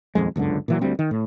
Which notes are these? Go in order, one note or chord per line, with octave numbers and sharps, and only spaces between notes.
D#1 F2 G#3
G1 C#2 F#2 D3
A#2 E3 F#3
D2 G3 C4
D#3
A2